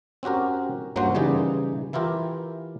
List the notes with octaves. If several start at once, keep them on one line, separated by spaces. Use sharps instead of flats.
C4 C#4 F#4 G4 A#4
G2 F#3 A#3 C#4 F#4 C5
C#3 E3 G3 D#4 G4 G#4
E3 E4 F4 G4 A#4